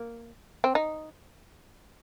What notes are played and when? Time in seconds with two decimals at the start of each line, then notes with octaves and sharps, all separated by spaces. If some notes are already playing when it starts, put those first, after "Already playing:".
Already playing: A#3
0.64 C4
0.75 D#4